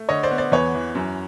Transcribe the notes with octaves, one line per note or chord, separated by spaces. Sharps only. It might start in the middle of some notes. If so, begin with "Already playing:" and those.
Already playing: A3
D3 C#5 D#5
C5 D5
B3
C5 D5
E2 B4 C#5
E3
F#2